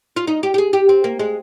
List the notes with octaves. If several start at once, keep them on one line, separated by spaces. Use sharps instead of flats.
F4
D#4
G4
G4
G#4
G4
C4
A#3
G#3